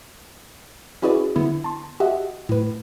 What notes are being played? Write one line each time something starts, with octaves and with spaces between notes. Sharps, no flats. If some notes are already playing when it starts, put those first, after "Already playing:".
C#4 E4 F#4 G#4 B4 D5
D3 B3 E4
A5 C6
F#4 G4 D#5 E5 F#5
A2 B4